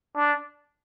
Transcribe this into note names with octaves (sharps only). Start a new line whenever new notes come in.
D4